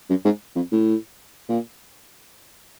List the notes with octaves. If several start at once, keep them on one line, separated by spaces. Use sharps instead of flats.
F#2
G#2
F2
A2
A#2